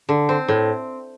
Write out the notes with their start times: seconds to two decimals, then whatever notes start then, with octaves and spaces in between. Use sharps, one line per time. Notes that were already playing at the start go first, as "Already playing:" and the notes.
0.09 D3
0.29 C4
0.48 A2